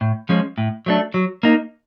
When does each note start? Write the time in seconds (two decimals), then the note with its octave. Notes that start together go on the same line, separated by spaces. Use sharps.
0.01 A2
0.29 F3 G#3 C#4
0.58 A2
0.86 F#3 A3 D4
1.14 F#3
1.43 A#3 D#4